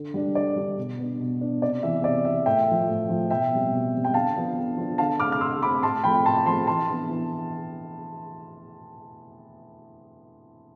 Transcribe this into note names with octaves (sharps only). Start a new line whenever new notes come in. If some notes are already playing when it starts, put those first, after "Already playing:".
Already playing: D3
G3 D4
D3 D5
G3 D4
B2
B3 D4
B2
B3 D4
C3 D5
E3 B3 E5
C3 D5
E3 B3 E5
A2 E5 G5
F3 A3
A2
F3 A3
B2 E5 G5
G3 C4
B2
G3 C4
G5
D3 F5 A5
F3 B3 D4
D3
F3 B3 D4
D3 F5 A5
A3 C4 D6 F6
F6
D3 C6 E6
A3 C4 B5 D6
A2 A5 C6
F3 A3 C4 G5 B5
A2 A5 C6
F3 A3 C4 A5 C6
E3 A5 C6
B3 D4
E3